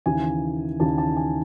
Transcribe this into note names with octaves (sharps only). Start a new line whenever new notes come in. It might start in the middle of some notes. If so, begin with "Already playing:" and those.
D#2 C#3 E3 G#5
D#2 C#3 E3 A5
A5
G#5